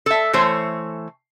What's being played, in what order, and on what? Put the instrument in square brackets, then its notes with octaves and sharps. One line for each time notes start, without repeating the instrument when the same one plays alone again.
[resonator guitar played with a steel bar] A4 E5
E3 A3 C5 C#5